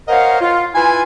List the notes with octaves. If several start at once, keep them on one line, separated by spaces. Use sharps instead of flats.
A#4 C5 C#5 D#5 F5 F#5
F4
E4 F4 B4 G#5